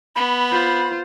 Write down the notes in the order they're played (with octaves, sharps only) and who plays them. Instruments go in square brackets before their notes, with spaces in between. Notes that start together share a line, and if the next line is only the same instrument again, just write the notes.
[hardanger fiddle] B3 [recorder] B5
[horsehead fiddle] F4 C5